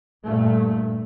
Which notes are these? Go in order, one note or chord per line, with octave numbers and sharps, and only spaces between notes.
G2 A#2 A3